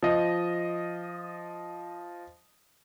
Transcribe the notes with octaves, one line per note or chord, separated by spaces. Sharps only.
F3 D#5